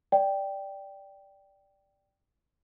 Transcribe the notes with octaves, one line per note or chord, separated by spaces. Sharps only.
D5 G5